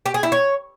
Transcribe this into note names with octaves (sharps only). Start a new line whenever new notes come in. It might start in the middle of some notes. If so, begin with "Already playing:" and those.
G4
G#4
E4
C#5